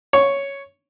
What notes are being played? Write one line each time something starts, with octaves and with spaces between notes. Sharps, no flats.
C#5